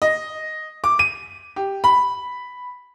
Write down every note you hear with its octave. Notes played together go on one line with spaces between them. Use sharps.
D#5
D6
D#7
G4
B5